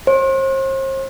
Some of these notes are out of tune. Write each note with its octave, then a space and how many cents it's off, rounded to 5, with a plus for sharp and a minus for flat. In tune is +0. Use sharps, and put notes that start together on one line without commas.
C5 +40